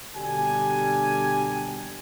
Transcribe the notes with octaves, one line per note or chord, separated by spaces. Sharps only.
B2 D3 G3 D4 G4 G#5